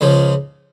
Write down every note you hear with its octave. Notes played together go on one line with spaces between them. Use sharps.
C#2 C#3 F3